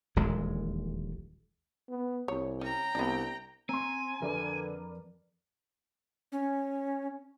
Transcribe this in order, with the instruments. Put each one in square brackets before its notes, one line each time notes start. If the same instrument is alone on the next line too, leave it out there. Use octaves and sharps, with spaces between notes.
[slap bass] D#1 A#1 E2 G#3
[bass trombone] B3
[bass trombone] C2 [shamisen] C#5
[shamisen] C#4 [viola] G5 A#5
[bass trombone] C2 [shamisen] B3 D4
[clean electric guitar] C4 [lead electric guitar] G#5 [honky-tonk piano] A#5 C6
[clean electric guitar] F2 [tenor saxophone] D3 [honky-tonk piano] A#4 B4 D5
[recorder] C#4